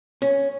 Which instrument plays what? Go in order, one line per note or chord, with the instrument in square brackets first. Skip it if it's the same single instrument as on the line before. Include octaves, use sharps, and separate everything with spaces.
[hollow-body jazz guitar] C#4